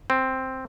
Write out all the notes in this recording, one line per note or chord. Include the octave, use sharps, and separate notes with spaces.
C4